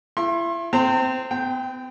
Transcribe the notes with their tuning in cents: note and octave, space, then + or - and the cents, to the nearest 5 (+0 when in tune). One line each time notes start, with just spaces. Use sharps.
E4 +35 C6 +40
C4 -15 C5 +0 A#5 -45
B3 +45 G5 +0